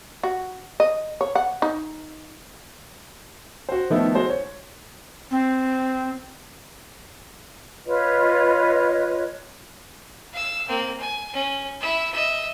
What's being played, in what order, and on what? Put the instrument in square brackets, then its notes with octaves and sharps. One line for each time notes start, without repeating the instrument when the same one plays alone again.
[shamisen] F#4
D#5
C#5
F#5
D#4
[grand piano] F#4 C5
D#3 F3 A3 B3 D#4 E4
G#3 F#4 C5
C#5
[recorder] C4
[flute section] F4 B4 C#5 D#5
[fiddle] F5 E6
A#3 C4
G#5
C#4
E4 E5
D#5 E5